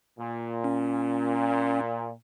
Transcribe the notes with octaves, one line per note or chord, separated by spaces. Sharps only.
A#2
C#4